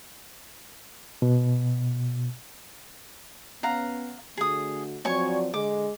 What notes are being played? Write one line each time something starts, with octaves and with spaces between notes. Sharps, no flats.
B2
B3 C#4 F5 F#5 A#5
D3 A3 F#4 G#4 D#6
F3 F#3 C4 C#5 D5 G#5 C#6
D3 G#3 D6